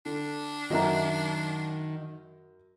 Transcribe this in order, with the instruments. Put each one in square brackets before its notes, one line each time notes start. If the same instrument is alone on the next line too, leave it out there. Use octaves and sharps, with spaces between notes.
[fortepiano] D3 [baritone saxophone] D4
[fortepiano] F#2 F#3 [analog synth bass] D#3 [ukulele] D#5 E5 A#5